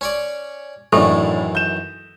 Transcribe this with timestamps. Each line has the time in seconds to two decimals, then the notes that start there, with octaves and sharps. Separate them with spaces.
0.01 C#4 C#5 D5
0.93 F#2 A2 D#3 E3 D4 A4 C#6
1.55 G6 E7